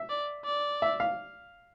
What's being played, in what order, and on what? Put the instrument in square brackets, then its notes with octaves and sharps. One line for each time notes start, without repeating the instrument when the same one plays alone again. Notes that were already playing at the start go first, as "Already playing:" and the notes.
Already playing: [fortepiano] E5
[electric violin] D5
D5
[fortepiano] E5
F5